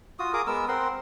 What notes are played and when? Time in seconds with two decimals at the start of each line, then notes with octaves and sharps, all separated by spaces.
0.19 F4 F#4 D#6
0.34 G#4 A#4 D6 D#6
0.47 G#3 B3 A#4 E6
0.68 C4 A#4 F#5 C6